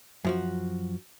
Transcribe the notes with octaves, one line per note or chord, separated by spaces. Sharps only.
F#2 F3 F#4